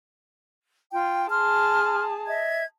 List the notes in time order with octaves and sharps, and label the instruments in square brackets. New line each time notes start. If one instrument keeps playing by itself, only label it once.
[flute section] F4 G5
[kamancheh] G#4 A5 [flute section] C6 F6
[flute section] D#5 E5 G#6